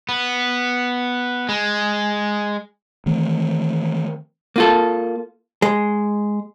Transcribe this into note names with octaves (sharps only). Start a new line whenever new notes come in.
B3
G#3
D#3 E3 A3 C4
A#3 F4 A4
G#3